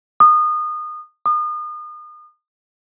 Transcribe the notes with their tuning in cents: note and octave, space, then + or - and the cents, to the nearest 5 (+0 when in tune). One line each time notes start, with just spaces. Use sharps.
D#6 -25
D#6 -35